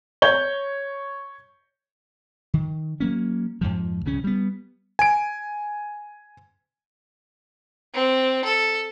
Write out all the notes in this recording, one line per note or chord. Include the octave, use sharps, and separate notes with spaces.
C#5 G6 G7
D#3
F#3 A#3 C#4
F2 G#2 F3
C2 C#3 C#4
G3 B3
G#5 D7
C4
A4